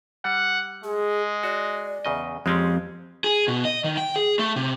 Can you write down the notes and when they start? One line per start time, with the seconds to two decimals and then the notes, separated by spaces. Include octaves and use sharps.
0.25 G3 F#5
0.84 G#3 G#4
1.43 F#4 D5
2.05 E2 C#3 D#5
2.46 F2 G#3 C4 C#4 G4
3.24 G#4
3.48 B2
3.65 D#5
3.84 D#3
3.97 G5
4.16 G#4
4.39 A3
4.56 C3